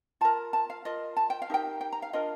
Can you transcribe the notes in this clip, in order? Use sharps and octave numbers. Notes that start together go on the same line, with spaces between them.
F4 A#4 A5
A5
F5
F4 A#4 D#5
A5
G5
F5
D#4 G4 A#4 G5
G5
A#5
F5
D4 F4 A#4 D#5